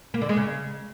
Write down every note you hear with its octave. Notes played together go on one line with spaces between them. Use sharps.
A#3
D3
G#3
C#3